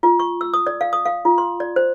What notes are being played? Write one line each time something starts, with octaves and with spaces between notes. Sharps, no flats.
F4
C#6
E6
D#6
D5
F5
D#6
F5
F4
C6
D5
C5